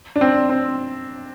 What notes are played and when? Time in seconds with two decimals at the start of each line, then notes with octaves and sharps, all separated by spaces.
0.16 D4
0.21 C4
0.49 C4